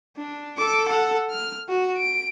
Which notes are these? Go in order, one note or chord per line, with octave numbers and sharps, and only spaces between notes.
D4
A4 D6
A4 F#5
F6
F#4
D7